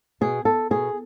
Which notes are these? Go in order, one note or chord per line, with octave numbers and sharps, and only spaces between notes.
B2 G#4
A4
B2 G#4